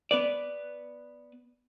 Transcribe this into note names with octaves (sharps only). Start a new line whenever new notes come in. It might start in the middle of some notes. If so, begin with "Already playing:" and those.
B3 B4 D5